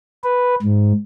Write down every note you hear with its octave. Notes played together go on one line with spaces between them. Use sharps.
B4
G#2